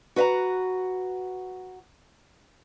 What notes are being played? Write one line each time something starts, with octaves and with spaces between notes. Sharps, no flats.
F#4 B4 E5 F#5 A#5